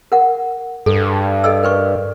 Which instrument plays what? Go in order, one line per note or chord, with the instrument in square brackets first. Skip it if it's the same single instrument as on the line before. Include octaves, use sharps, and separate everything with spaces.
[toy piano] A#4 F#5
[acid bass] G2 [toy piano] A4
[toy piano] A4 D#5 E6
A#4 B4 C#6